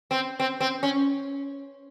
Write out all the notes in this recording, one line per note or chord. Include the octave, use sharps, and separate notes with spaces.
C4
C4
C4
C#4